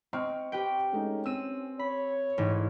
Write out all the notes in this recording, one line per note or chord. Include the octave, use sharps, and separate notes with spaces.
C4 D#5 C#6 F6
G4 B4 G5
G#3 A3 C#4 D#4
C4 E6 D#7
C#5 B5
A1 G#2